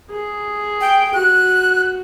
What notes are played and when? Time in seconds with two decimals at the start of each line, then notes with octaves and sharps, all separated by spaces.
0.10 G#4
0.81 G5
1.14 F#4 F#6